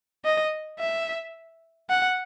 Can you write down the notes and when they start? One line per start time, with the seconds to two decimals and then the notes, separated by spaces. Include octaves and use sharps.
0.25 D#5
0.80 E5
1.90 F#5